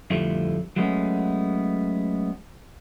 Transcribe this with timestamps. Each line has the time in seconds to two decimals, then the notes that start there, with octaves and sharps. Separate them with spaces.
0.10 F2 A2 D3 F3 G3 A3
0.76 F#3 G#3 A3 B3 C#4